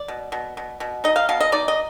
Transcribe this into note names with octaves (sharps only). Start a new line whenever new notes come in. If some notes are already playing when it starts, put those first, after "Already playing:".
Already playing: D5
B2
B2
B2
B2
D#4 D#5
F5
B2 F5
D#5
D#4 D5
D#5